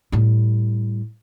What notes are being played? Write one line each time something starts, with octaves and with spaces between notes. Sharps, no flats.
A2 G3